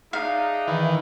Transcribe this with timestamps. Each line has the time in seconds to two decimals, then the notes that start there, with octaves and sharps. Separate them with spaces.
0.13 D4 D#4 G#4 E5 F5
0.67 D#3 E3